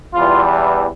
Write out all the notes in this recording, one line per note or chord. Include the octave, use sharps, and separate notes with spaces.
E2 E3 G3 F4